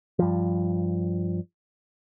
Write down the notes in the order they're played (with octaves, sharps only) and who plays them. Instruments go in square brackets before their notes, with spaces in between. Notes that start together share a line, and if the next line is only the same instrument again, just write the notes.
[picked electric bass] G2 F3